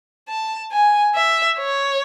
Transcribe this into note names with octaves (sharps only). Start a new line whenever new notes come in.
A5
G#5
E5
C#5